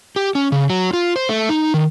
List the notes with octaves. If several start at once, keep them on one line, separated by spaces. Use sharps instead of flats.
G4
C#4
C#3
F#3
F4
C5
A3
D#4
D#3